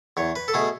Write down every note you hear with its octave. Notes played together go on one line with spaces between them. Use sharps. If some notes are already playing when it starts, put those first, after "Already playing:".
E2 C#5
B4
A4
B2 A3 G#4